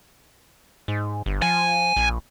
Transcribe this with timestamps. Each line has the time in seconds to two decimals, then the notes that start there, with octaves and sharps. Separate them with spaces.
0.88 G#2
1.26 G1
1.42 F3 G#5
1.96 A#1